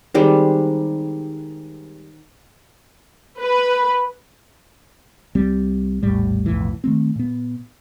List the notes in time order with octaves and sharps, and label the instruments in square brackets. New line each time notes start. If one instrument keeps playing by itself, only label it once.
[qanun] D#3 G3 G#3 C4
[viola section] B4
[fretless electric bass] C2 G3 C4
A#1 E2 A2 G3
B1 F2 A2 E3
D#3 A3 C4
A#2 B3